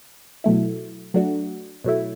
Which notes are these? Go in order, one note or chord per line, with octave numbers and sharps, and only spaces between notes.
B2 F#3 A3 E4
F#3 A3 D4 F#4
B2 F#3 A3 E4